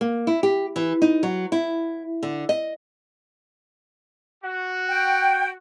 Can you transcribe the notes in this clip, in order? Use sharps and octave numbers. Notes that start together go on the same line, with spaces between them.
A#3
E4
G4
E3
D#4
F#3
E4
D3
D#5
F#4
G5